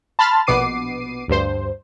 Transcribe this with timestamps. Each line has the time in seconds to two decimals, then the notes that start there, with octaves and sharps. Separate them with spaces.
0.19 A5 B5 C6 F6 A6
0.47 A#1 B2 B3 D6 C7 D#7
1.28 D2 G2 C5